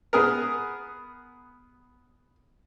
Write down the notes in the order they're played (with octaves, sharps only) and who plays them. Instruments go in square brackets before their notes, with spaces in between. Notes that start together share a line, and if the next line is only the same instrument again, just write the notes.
[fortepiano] B3 G#4 A#4